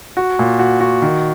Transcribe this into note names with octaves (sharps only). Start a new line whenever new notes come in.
F#4
A#2
F#4
F#4
D#3